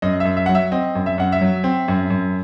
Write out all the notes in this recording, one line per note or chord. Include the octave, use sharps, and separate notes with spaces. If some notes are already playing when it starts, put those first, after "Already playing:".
F#2 D#5
F#2 E5
E5
F#3 F#5
E5
C4 D#5
F#2
E5
F#2 F#5
E5
F#3
C4
F#2
F#2